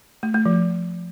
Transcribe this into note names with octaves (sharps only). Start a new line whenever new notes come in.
A3
A3
F3